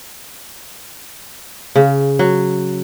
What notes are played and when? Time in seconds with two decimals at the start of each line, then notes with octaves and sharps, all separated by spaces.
1.76 C#3
2.19 F#3